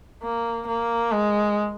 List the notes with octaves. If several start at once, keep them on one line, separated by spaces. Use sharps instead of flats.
A#3
A#3
G#3